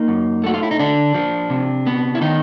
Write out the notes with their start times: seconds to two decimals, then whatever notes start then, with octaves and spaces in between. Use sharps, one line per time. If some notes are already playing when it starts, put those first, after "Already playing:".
Already playing: A#3 D#4
0.08 F#2
0.44 A3 F#4
0.54 F4
0.63 E4
0.71 D#4
0.79 D3 D4
1.15 F3
1.50 C3
1.87 B3
2.15 E4
2.21 D#3 D#4